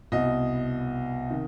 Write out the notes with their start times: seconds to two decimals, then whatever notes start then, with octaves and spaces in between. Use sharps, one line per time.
0.12 C2 B2 D#5
1.30 C3 D#3